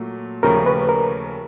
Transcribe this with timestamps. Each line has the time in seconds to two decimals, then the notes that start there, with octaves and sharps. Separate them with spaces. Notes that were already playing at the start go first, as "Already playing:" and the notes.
Already playing: A#2 F#3 A3
0.43 D#2 C#3 F3 A3 C#4 A#4
0.66 B4
0.89 A#4